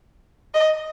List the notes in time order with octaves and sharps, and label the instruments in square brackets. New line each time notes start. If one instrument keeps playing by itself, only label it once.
[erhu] D#5